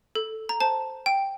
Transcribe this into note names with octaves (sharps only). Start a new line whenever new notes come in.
A4
A#5
C5 A5
G5